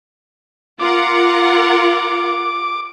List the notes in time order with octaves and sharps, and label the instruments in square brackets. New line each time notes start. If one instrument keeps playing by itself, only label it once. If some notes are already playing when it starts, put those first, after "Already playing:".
[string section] F4 A#4 F#5 [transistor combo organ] D6